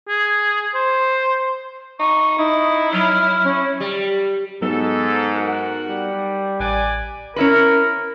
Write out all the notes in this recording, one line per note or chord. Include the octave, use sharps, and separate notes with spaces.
G#4
C5
D#4 C#6
D#4 E4
F#3 F6
C#4
G3
G#2 F#3 B3 D#4 A4
F#4 A#4 F#5
G3
A1 B4 D5 G#5
C#4 E4 A#4 B4